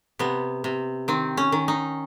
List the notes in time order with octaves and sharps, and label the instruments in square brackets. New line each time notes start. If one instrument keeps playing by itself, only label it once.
[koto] C3 B3
C3
D#3 C4
C#4
D#3
D#4